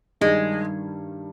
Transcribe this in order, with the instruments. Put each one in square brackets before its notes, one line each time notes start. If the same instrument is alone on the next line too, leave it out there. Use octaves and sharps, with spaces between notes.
[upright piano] G2 D#3 G3 [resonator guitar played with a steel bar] G#3